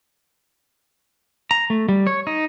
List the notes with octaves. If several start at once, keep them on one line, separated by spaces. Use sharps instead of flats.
A#5
A3
G3
C#5
D#4